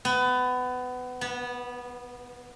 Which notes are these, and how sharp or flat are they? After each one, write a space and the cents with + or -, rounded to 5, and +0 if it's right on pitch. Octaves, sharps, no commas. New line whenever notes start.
B3 +25
B3 -15